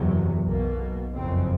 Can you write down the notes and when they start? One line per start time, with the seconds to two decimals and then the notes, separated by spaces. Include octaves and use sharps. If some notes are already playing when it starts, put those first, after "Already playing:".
Already playing: F#1 E2 C3 F#3
0.46 B1 B2 A#3
1.14 F#1 F2 C#3 C4